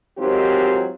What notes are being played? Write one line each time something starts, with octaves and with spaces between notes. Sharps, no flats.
G#2 D#3 F#3 C4 F4 G4